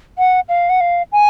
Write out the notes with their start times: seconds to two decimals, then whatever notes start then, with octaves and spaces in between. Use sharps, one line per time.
0.18 F#5
0.49 F5
0.69 F#5
0.81 F5
1.12 G#5